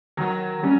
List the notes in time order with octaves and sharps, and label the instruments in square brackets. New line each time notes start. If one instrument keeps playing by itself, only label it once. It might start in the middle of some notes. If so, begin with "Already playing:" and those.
[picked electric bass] D#3 [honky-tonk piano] F#3
[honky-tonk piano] G3 [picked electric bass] C#4